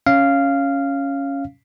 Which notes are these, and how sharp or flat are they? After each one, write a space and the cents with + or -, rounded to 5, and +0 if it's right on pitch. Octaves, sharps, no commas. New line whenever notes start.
C#4 +0 F5 -10